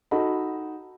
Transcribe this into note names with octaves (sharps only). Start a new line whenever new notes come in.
D#4 F#4 A4 D#5 B5